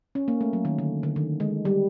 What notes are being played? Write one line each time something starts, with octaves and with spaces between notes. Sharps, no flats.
C#4
A#3
A3
F#3
D#3
D3
D3
D#3
G#3
G3